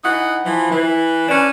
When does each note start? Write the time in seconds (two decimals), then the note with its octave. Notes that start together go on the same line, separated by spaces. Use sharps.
0.03 E3 D#4 F#5
0.45 E3 F3
0.70 E3
1.28 C#4 D4 B4